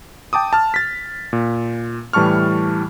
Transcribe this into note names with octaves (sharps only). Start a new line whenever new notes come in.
G5 A5 D6 D#6
A5 F6
A6 B6
A#2
A2 E3 G3 A5 C#6 F6